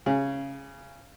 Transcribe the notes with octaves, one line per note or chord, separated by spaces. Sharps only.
C#3